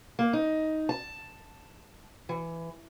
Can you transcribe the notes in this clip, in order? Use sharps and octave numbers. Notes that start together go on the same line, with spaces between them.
A#3
D#4
A5
E3